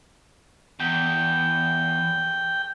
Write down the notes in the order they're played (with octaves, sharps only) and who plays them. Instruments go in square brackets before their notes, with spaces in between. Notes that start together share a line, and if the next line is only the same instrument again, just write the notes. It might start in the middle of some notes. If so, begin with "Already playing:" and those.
[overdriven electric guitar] E2 [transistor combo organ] G5